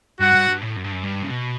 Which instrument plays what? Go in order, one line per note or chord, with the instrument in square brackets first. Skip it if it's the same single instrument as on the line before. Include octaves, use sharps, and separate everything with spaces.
[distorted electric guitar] G2 [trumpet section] F#4 F#5
[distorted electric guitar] G2
G2
A2
F#2
G2
F#2
G2
C#3
B2